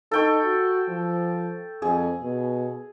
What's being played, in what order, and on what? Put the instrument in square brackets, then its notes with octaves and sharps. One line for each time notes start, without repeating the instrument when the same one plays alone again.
[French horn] D#4 [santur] A4 G5 C#6
[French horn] F#4
F3
[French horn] F2 [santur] G#4
[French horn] B2